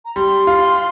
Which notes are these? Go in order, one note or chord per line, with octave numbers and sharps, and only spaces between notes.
A#5
G3 C6
F4